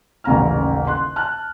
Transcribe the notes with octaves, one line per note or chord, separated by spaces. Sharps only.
D#1 A1 C#3 F5 A#5 F6
C6 F#6
A5 F6 F#6